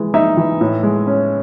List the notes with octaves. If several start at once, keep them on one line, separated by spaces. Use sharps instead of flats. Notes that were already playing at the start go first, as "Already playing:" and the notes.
Already playing: E3 G#3
D#4 E5
E3
A2
G#3
C#4